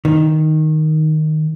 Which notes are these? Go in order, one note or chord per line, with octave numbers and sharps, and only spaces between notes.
D#3